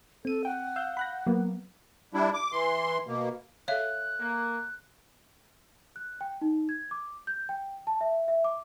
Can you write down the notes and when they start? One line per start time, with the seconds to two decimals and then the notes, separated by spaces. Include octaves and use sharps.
0.25 C4 A4 D#7
0.45 F#5 G5
0.76 F5 E6 G6
0.97 B5 F#6 A#6
1.27 F#3 A#3 B3
2.14 G3 D4 E4
2.34 D6
2.52 E3 C6
3.07 B2 A#3
3.68 A4 C#5 E5 F5 F#6
4.20 A#3
5.96 F#6
6.21 G5
6.41 D#4
6.69 G#6
6.91 D6
7.27 G6
7.49 G5
7.87 A5
8.01 E5
8.28 E5
8.44 D6